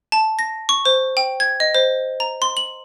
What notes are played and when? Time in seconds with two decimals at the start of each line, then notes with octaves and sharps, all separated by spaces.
0.12 A5
0.39 A#6
0.69 C#6
0.85 C5
1.17 G5
1.40 G#6
1.60 D#5
1.75 C5
2.20 A#5
2.42 C6
2.57 F#7